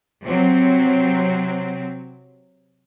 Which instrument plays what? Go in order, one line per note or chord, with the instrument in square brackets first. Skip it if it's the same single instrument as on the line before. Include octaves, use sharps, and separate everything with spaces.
[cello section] C3 F#3 C4